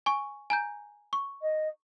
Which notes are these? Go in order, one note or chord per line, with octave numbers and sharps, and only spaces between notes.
G#5 C#6
G#5 A#5 G6
C#6
D#5